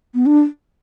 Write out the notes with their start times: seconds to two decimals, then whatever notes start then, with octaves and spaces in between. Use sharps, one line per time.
0.14 B3
0.26 D4